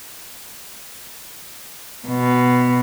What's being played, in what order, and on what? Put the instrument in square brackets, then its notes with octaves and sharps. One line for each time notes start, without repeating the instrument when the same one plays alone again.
[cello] B2